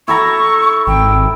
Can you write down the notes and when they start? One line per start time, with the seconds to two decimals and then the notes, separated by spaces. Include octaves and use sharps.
0.08 E4 A4 A#5 C#6
0.87 G#1 G5